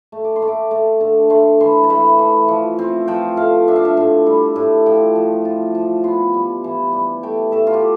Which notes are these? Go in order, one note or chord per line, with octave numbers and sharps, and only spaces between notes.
A3
D6
C6
A3
D6
A3
D3
A3 C6
E3 C6
A5
A3 B5
E3
F3
C4
F3 G5
A3 F5
D4 E5
F5
E5
A2
G3
A2
F3 G5
F3
F4
F3
B3 C6
G3
E3
G3
A3 G5
A3 E5
F4
G4